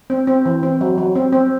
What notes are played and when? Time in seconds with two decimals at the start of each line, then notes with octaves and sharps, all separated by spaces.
0.10 C4
0.27 C4
0.46 E3
0.63 C4
0.81 F#3
0.98 F#3
1.15 C4
1.33 C4